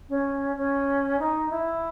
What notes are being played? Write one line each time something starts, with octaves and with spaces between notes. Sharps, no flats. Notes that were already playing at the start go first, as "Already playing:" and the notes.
C#4
C#4
D#4
E4